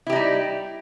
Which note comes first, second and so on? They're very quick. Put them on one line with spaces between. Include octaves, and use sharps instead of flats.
E4 G4 D#4 G3